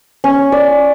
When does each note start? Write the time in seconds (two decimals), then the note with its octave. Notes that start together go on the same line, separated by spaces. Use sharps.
0.24 C#4
0.52 D5